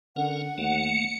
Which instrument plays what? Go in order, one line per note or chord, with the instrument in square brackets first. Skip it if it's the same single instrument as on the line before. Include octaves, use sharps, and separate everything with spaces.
[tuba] D3 [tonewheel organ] C#4 A#4 [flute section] F#5
[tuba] D#2 [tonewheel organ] A3 A#3 [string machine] C#7